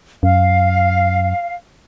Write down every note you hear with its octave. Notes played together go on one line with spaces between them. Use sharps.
F#2 F5